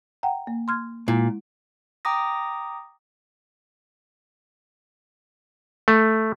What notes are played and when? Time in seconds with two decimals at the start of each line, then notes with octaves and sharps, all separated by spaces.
0.23 F#5 G5 A#5
0.47 A#3
0.68 C6 F6 G#6
1.08 A#2 G#3 E4
2.05 G5 A#5 D6 D#6 A#6
5.88 A3